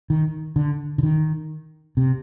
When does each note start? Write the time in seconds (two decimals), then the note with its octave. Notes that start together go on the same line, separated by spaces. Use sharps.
0.10 D#3
0.56 D3
0.98 D3
1.03 D#3
1.97 C3